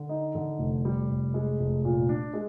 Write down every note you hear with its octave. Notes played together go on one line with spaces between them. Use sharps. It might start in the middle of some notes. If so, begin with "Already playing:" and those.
Already playing: D3
D#4
D3
F1
G3
F1
G#3
F1
A#2
D4
G#3